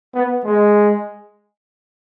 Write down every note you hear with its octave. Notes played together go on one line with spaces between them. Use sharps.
B3
G#3